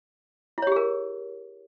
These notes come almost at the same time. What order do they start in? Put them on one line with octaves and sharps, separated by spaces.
E4 C#5 G4 G#4 A#4